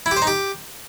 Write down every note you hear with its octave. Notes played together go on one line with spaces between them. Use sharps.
E4
G4
C5
D#4
G4